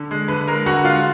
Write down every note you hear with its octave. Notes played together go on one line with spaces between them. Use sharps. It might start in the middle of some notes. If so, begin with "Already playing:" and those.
Already playing: D3
G#3
D3 B4 B5
G#3 A#4 A#5
D3 F#4 F#5
G#3 F4 F5